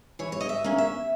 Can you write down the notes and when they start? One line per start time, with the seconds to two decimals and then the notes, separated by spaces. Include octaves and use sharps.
0.19 E3 C#5
0.32 C#5
0.41 D#5
0.49 E5
0.64 A#3 C#4
0.78 E5